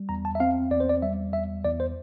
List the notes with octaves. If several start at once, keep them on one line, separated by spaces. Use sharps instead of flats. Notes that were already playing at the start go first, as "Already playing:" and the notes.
Already playing: G3
E2 A#5
A5
E5
C4 F5
E2 D5
C5
D5
G3 E5
E2 E5
E2 D5
C5